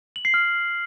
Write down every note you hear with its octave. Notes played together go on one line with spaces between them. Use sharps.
F#7
C7
F6